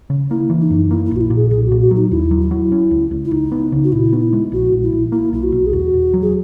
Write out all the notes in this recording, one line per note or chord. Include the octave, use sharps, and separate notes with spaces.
C#3
A#3 E4
E3
D#4
F#2
A#3 E4
E4
A#1
F#4
E4
A#2
G#4
B1 G#4
F#4
A#2
F#4
F#3
D#4
D#2 E4
F#3
E4
F#3
C#4
C#2
C#2
E4
C#2 D#4
B3
C#3
F#4
A#2 E4
B3 D#4
E4
G#3
A#1 F#4
A#1
E4
A#1
A#3 E4
B1 E4
F#4
B1
G#4
E1 F#4
E1
F#3
G#4